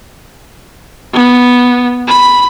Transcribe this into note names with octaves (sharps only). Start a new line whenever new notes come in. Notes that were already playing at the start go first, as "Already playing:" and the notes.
B3
B5